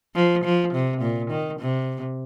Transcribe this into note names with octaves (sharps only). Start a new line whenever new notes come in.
F3
F3
C3
A#2
D#3
C3